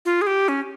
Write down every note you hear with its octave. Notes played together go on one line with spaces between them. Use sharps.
F4
G#4
G4
C#4